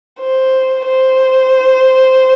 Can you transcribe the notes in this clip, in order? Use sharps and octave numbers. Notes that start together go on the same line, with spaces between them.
C5
C5